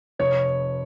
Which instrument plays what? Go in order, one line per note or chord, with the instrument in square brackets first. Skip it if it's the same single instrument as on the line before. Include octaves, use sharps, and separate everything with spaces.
[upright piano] F1 C#5